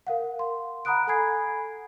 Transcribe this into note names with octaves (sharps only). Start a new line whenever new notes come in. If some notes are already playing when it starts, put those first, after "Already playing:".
A#4 F5 F#5
C6
F#5 A#5 B5 D#6 F#6 D7
A4 F#5 G#5 B5 G#6 C7